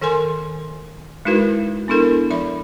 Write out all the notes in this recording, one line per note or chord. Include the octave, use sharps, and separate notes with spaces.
D#3 A4 A#4 G#5 C6
G#3 D#4 E4 F#4 A#4 B4
B3 D4 E4 A4 A#4
F3 E5 B5